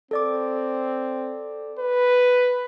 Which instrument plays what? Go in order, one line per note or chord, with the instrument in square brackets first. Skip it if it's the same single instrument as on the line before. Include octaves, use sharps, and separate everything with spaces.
[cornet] C4 [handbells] A4 D5 D6
[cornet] B4